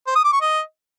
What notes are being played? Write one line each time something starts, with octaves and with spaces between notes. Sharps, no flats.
C5
D#6
D6
C#6
D#5